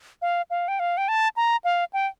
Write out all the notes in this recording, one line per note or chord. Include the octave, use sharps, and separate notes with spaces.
F5
F5
G5
F5
G5
A5
A#5
F5
G5